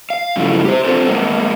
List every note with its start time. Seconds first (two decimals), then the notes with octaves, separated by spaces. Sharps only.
0.10 F5
0.36 G2 C#3 F3 F#3 A3 E4
0.65 G4 C5
0.84 C4 D4 F4 G4 A4 C5
1.08 G#3 A#3 B3